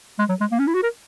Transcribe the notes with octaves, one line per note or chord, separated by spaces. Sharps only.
G#3
F#3
G#3
A#3
C#4
E4
F#4
A#4